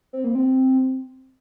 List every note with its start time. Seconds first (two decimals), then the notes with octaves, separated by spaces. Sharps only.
0.13 C4
0.24 A#3
0.35 C4